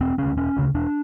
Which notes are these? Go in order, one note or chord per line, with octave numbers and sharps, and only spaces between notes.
E1 C4
D2 C#3 C#4
E1 C#4
D2 C#3
E1 D4